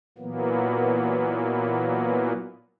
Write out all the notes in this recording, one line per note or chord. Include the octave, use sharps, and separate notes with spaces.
A#2 E3 F#3 A#3 B3